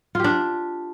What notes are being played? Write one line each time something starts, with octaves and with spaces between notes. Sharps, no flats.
D4 F4 G4